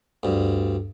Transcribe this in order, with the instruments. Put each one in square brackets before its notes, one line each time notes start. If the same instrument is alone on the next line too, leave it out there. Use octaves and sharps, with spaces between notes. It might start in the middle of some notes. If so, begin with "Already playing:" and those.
[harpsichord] D2 G2